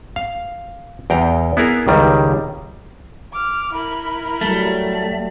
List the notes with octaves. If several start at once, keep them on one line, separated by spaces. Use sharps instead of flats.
F5
E2 G5 A#5
B3 E4 G#4 A#4
C#2 D#3 G3
D6 F6
E4 A#4 B5
F#3 G3 A3